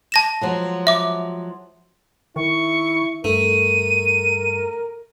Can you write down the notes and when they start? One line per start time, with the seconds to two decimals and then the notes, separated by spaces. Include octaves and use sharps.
0.12 A5 A#6 E7
0.41 F3 F#3 G#3
0.87 E5 D6
2.36 D#3 E4 C#6
3.24 G2 A3 A#4 D#7